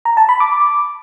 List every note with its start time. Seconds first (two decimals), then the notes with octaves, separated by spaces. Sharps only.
0.05 A#5
0.17 A5
0.29 B5
0.40 D6